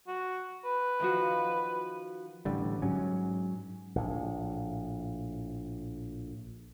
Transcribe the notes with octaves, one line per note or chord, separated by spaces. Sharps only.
F#4
B4
D#3 F3 F#4
A1 D3 G3
G#2 F#3 C#4
A#1 A2